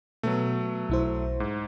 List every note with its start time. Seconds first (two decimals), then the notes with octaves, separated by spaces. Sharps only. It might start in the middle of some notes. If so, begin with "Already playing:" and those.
0.23 B2 F#3 A3 B3
0.89 B1 E4 C5
1.40 G#2